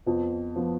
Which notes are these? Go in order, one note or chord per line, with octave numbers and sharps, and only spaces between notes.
F2 F3 B3
F3 B3